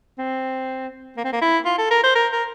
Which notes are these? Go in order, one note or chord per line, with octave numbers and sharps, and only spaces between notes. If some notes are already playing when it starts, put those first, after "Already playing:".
C4
A#3
C4
A#3
E4
F4
A4
A#4
C5
A#4
A#4